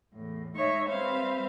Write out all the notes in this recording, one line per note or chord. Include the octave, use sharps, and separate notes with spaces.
E2 A2
G#2 D#4 C#5 E5 C#6
G3 C4 B4 C5 E5 F5